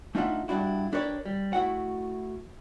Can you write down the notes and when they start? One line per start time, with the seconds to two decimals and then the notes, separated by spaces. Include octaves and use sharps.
0.15 A3 D4 D#4 F4 E5 F#5
0.48 G2 A#2 D4 E4 F#4
0.93 D4 G4 A#4 B4 C#5 D5
1.26 G3
1.53 A3 E4 F#4 F#5